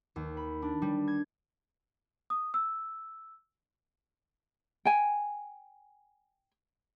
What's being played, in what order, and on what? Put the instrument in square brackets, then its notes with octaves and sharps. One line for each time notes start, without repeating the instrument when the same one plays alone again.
[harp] D#2
B5
D4
G3
G#6
[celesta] D#6
E6
[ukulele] G5 G#5